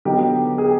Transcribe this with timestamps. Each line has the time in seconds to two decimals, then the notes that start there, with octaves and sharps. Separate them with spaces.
0.05 D3 F#3 B3 D#4 G4
0.58 G#4